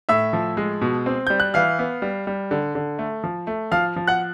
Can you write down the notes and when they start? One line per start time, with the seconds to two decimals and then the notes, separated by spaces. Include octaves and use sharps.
0.09 A2 E5 E6
0.33 F3
0.57 G#3
0.82 B2
1.06 C4
1.27 G3 G6
1.40 F#6
1.54 E3 F5 F6
1.79 B3
2.02 G3
2.27 G3
2.51 D3
2.75 D3
2.99 A3
3.24 F3
3.47 A3
3.72 F3 F5 F6
3.96 F3
4.08 F#5 F#6